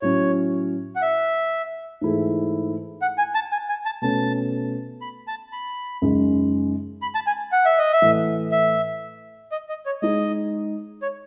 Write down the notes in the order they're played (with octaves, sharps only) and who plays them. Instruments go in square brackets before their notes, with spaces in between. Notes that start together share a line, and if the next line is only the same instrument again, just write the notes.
[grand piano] A2 F#3 C#4 [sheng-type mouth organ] C#5
[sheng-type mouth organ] F#5
E5
[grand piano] G#2 E3 A3 E4 G#4
[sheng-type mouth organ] F#5
G#5
A5
G#5
G#5
A5
[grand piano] B2 A3 C#4 [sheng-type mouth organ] A5
[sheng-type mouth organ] B5
A5
B5
[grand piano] F#2 C#3 G#3 D#4
[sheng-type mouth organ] B5
A5
G#5
F#5
E5
D#5
E5
[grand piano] A2 E3 A3
[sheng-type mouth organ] E5
D#5
D#5
C#5
[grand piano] G#3 D#4 G#4 [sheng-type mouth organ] D#5
[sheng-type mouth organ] C#5